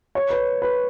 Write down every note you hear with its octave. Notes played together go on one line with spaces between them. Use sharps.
C#5
B4
B4